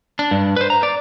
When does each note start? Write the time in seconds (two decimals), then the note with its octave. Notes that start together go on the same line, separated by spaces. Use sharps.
0.19 D4
0.31 G2
0.56 B4 C5
0.70 A#5
0.83 D5